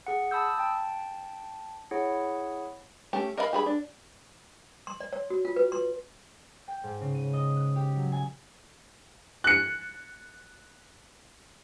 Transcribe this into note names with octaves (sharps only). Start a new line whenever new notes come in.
G#4 F#5
A5 B5 D#6 E6 G6
G5 A5
E4 G#4 C#5 F#5
A3 C#4 G4
A#4 D#5 F5 F#5 B5
G4 G#4 B5
D4
C6
D5
C#5
F#4
F4
B4
C6
G5
G#2
C#3
D#7
D#5
F#6
G4
F#3
G#5
F#6 C#7